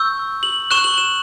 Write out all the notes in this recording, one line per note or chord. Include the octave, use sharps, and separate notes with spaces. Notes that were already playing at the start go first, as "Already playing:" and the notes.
Already playing: C#6 E6 G6
F#7
C#6 F#6 E7
F#7
E7